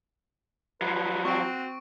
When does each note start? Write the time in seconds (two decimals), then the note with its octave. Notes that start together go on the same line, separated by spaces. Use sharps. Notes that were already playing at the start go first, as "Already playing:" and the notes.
0.82 F3 F#3 B4
1.25 C4 F#4 C#6 D7